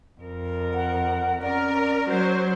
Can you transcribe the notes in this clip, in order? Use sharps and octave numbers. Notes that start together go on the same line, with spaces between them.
F2 A#4
F#5
C#4 A#4 D5
F#3 C5